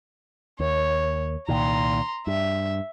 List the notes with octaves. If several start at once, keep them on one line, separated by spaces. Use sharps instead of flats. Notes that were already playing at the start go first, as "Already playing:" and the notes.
D#2 C#5
C2 A#2 D#3 A#5 C6
G2 E5